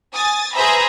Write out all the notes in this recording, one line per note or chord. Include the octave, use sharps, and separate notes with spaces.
G#5 D#6 A6
G#4 B4 C5 E5 A#5 B5